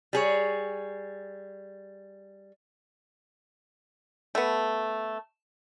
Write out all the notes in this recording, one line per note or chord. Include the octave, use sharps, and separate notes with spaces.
G3 G#4 C#5
A3 B3